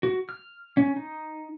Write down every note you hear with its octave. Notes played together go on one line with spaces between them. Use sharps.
F#4
F6
C#4
D#4